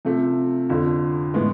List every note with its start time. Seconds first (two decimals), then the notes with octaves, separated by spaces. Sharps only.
0.05 C3 F3 A3
0.69 F2 D3 F3
1.34 A2 E3 G#3 B3